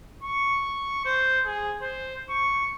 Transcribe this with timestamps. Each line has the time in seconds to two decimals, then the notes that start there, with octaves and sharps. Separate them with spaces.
0.23 C#6
1.05 C5
1.46 G#4
1.81 C5
2.29 C#6